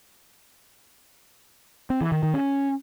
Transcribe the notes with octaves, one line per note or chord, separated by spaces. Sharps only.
C4
E3
D#3
D#3
C#4